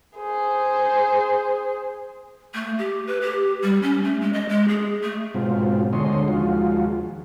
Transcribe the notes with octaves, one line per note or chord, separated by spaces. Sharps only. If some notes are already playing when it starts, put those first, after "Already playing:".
G#4 C5
A3
G4
B4
G4
G3
C#4
A3
G#3
D#5
G#3
G#4
A3
G#2 B2 F#3 C4 F4
D2 D3 G#3 C#5 D#5 C6
D#2 F3 G#3 F4 F#4